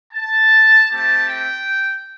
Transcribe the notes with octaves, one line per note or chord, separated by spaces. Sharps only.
A5
A3 C4 G4 A5
G5